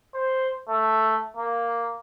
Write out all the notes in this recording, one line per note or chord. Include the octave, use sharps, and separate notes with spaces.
C5
A3
A#3